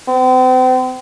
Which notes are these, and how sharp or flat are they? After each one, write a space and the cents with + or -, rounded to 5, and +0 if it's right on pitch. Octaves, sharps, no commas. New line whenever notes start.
C4 -40